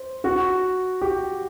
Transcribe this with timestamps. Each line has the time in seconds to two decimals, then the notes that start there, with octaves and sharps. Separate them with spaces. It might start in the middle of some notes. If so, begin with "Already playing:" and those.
Already playing: C5
0.24 F#4
1.01 G4